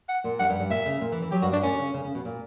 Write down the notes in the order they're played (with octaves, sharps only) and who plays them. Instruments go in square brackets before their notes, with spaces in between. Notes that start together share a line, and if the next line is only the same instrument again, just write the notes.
[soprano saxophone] F#5
[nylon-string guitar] A#2
[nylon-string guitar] G2 [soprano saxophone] F#5
[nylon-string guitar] G2
G2
[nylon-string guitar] A#2 [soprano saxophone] E5
[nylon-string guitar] C#3
A#2
E3
E3
[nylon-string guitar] F#3 [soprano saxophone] G4
[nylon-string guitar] G2 [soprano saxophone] F#4
[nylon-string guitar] G2 [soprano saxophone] D4
[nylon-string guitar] A#2 [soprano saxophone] C#4
[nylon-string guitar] B2
C#3
C#3
C#3
B2
A#2